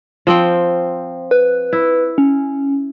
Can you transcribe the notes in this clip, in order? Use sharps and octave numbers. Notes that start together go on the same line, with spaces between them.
F3 C4 G5
B4
E4
C#4